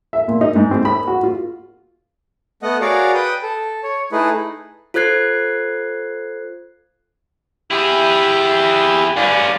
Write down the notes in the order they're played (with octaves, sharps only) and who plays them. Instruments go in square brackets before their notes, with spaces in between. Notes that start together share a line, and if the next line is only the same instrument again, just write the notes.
[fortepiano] E5
A#2
D#4
G#2
C4
B5
F#4
F4
[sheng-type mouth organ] A3 B3 D#5 F#5
F#4 G#4 A#4 C#5 D5 F5
B4 G5 D#6
A4
C#5
A3 D#4 E4 G#4 B4
[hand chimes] F4 A4 C5 F#6 G#6 C7
[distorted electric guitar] E4 G#4 [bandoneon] G4 E6
[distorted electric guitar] G2 C#4 [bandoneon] D5 F5 G#5